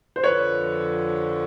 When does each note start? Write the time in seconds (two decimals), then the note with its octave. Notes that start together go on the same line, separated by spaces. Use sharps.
0.16 C5
0.24 F2 D3 F3 B4 C#5